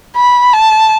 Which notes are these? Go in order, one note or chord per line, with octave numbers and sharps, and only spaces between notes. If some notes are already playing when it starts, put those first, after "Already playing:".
B5
A5